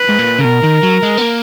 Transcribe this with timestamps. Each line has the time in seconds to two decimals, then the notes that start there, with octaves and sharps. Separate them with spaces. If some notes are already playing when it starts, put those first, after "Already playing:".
Already playing: B4
0.09 G#2
0.19 A#2
0.39 C#3
0.44 B2 A#4
0.63 D#3
0.83 F#3
1.02 G#3
1.17 B3
1.21 A#3